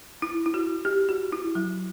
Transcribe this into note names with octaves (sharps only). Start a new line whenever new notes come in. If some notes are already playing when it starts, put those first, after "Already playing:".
E4
E4
F#4
G4
F#4
E4
F#3